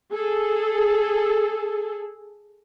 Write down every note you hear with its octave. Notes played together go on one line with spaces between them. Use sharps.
G#4 A4